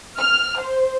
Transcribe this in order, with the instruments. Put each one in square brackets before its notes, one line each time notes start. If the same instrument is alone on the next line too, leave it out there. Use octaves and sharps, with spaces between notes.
[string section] F6
C5